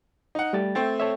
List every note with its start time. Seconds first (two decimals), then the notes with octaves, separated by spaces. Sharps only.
0.35 D#4 F#5
0.53 G3 A3 G5 A6
0.75 A3 C4 G5 A6
1.00 A4 C#5 E5